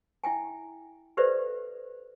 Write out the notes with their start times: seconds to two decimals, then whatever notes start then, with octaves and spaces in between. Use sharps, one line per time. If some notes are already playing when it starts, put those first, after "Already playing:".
0.24 E4 E5 G5 G#5
1.17 G4 A4 B4 C5 D5 E5